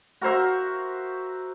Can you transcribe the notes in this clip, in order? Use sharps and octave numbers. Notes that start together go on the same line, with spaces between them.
F#4 A#4 C5 E5